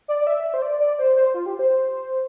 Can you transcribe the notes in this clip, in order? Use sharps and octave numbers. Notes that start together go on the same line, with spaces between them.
D5
D5
E5
C5
D5
D5
C5
C5
F4
G4
C5